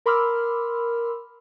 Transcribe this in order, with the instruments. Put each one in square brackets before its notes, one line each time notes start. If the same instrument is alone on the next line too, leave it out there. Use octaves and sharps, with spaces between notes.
[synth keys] A#4 B5 C6 D6 E6 F6